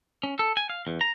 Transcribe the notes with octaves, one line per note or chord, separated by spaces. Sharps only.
C#4
A4
G#5
F5
E2
A#5